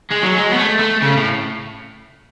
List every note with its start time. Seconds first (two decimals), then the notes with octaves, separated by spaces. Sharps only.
0.11 G#3
0.23 F#3
0.36 G#3
0.51 B3
0.56 A3
0.79 A3
1.02 C#3
1.17 A2